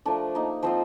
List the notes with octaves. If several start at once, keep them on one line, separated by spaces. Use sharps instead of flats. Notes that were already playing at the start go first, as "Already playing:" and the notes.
F3 A3 D4 A#4
A#3 D#4
F3 C4 F4 C5